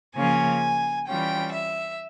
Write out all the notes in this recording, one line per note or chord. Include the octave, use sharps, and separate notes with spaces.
C#3 F3 A#3 C#4 F4 G#5
E3 G3 C#4 F4 G5
E5